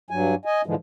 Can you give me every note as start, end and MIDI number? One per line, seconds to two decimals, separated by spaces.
0.11 0.35 43
0.11 0.35 54
0.11 0.35 80
0.45 0.62 75
0.45 0.62 80
0.66 0.75 44
0.66 0.75 50
0.66 0.75 52
0.66 0.75 53
0.66 0.75 56